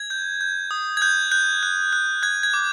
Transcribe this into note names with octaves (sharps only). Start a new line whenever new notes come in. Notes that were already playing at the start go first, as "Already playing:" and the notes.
Already playing: G#6
G6
G6
D#6
G#6
F#6 G6
F#6 G6
F#6
F#6
F#6 G#6
G#6
D6